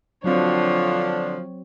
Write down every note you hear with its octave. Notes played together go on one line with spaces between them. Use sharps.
D3 F3 F#3 C4 D4 C#5